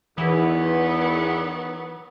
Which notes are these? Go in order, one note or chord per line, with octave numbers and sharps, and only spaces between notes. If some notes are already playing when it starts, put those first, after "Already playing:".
E2 D#3 E3 F#3 B3